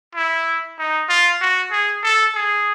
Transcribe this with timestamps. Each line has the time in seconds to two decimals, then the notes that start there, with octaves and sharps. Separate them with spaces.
0.15 E4
0.79 D#4
1.09 F4
1.41 F#4
1.72 G#4
2.03 A4
2.34 G#4